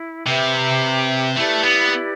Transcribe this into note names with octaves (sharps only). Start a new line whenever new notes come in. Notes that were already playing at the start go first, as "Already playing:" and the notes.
Already playing: E4
C3 G4 B4 E5
A3 E4 G4 B4 D5
B3